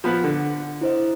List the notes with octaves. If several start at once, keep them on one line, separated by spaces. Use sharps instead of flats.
F3 B3 B4
D3
E4 C5 D#5